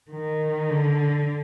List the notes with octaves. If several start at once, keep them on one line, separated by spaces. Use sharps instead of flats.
D#3
D3